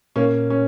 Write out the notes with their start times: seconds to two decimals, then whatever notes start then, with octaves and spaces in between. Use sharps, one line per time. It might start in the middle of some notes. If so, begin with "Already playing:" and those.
0.16 A#2 A#3 C#4
0.50 C#4